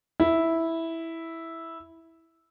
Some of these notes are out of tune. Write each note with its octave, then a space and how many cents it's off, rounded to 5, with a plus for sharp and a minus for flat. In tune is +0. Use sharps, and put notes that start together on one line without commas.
E4 -5